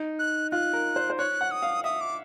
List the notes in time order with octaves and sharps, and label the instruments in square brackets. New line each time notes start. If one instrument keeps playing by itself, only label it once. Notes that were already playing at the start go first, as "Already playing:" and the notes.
Already playing: [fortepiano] D#4
[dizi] F#6
[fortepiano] F4 [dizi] F#6
[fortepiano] A#4
C5
C5
[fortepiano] C#5 [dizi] F#6
[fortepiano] F#5
[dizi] D#6
[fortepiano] F5
[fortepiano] E5 [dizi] D#6
[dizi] D6